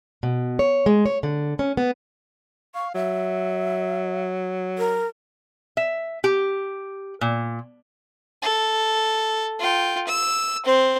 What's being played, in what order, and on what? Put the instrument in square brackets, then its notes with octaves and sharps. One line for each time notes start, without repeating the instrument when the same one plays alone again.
[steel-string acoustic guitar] B2
C#5
G#3
C#5
D3
C#4
B3
[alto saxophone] F5 [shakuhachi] C#6
[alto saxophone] F#3 [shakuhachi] E5
[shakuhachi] A#4
[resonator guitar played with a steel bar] E5
G4
A#2
[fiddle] A4
F4 G5
E6
C4 C5